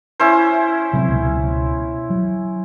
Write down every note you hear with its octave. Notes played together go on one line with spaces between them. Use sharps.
C#4 E4 C5
C3 F#3 C4
C#2 B2
F#3